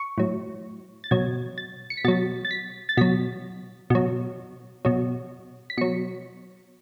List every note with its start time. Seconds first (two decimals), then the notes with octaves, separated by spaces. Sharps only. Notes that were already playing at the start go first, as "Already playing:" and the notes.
Already playing: C#6
0.18 A2 F#3
1.04 A6
1.11 B2 F#3 G#6
1.58 A6
1.90 C#7
1.97 B6
2.05 B2 F#3 A6
2.45 A6
2.51 B6
2.89 A6
2.97 B2 F#3 B6
3.90 B2 F#3
4.85 B2 F#3
5.70 B6
5.77 B2 F#3 C#7